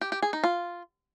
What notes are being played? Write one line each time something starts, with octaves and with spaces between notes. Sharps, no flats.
G4
G4
G#4
D#4
F4